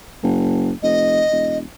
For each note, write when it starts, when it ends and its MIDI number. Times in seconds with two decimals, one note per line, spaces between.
0.23 0.71 30
0.83 1.24 29
0.83 1.58 75
1.31 1.63 28